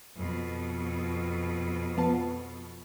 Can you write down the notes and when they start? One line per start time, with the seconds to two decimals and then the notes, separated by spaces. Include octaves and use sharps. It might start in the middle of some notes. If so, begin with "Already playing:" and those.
0.16 F2 B2
1.97 F3 B3 A5